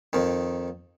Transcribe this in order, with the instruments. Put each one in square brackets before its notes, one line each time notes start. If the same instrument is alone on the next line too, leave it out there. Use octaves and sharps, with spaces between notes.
[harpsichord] F2 D#3